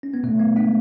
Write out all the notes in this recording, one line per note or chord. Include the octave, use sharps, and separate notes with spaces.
C#4
B3
B2 A3
B3
G#3 D4